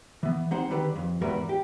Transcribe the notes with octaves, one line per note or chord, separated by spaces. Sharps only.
E3 B3
G3 C4 D#4 C5 F#5
D3 D#3 G3 G4 B4
F2
E2 G#2 G3 F#4 A#4 B4
G4